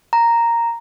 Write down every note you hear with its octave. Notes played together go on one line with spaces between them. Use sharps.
A#5